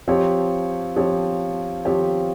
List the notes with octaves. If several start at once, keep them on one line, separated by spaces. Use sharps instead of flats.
F3 C4 G4 C#5
F3 C4 G4 C#5
F3 C4 G4 C#5